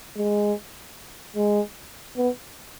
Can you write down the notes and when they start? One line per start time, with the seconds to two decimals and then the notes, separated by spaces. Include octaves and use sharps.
0.17 G#3
1.36 G#3
2.17 B3